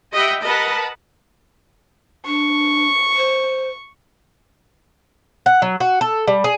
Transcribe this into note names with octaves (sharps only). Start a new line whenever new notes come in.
G4 D#5 E5 F#5 G5 B5
A#4 B4 D#5 F#5 A5 B5
D4 C#6
C5
F#5
F#3
F#4
A4
G3
G#4